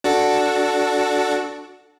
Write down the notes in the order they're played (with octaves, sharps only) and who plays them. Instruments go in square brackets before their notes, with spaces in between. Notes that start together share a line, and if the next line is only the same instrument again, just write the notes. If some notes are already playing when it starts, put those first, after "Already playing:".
[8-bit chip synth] D4 F#4 A4